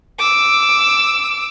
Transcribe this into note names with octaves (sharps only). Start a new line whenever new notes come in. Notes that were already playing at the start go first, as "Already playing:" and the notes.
D6 E6